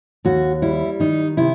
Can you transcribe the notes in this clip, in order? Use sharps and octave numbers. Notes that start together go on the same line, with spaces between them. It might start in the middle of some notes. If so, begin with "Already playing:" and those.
D#2 F#4
G3 E4
D#3 D#4
C3 E4